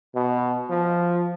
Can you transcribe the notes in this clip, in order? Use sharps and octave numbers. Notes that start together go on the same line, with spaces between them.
B2
F3